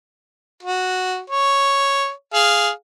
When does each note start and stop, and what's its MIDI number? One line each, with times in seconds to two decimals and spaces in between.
0.63 1.20 66
1.30 2.10 73
2.34 2.70 68
2.34 2.70 77